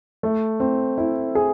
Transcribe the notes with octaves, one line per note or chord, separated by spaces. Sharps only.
A3
C4
E4
G#4